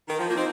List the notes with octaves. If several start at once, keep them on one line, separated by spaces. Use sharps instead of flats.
D#3
F3
A#3 F4
C4 D#4